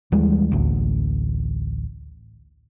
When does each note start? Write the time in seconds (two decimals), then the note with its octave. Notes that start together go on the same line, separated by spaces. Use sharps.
0.12 D#2 E3 G3 G#3
0.52 A1 D2